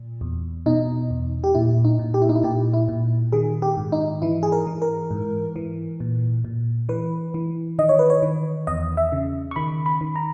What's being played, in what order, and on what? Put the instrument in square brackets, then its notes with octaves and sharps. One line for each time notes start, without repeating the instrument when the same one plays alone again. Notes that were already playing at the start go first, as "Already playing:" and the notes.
Already playing: [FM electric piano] A#2
E2
B2 D#4
E2
G4
A#2 E4
D#4
A#2
G4
E4
D#4
E4
A#2 G4
E4
A#2
D#3 G#4
G4
G#2
D#4
E3 E4
G#4
A#4
E3
A#4
G#2
E3
A#2
A#2
E3 B4
E3
D#3 D#5
C#5
B4
C#5
D#3
E2 D#5
E5
C#3
C#6
D#3 B5
B5
D#3
A#5